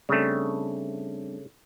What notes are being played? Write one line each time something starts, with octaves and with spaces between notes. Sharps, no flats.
C#3 G3 A3 C4 D4